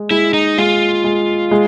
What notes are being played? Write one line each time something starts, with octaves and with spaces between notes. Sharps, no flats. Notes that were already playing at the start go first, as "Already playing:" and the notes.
Already playing: G#3
G#3 E4
D#4
G#3 F4
G#3
G#3